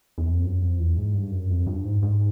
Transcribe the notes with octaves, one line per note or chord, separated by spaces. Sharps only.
E2
F2
F#2
F2
E2
G#2
G2
F#2
F2
G2
G#2
G#2